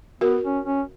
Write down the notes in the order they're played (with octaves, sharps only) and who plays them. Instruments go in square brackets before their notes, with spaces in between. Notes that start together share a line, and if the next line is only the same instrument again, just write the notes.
[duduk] B3 [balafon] F#4 A#4
[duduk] C#4
C#4